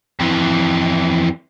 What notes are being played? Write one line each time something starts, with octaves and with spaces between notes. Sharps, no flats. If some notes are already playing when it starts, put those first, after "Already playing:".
F2 E3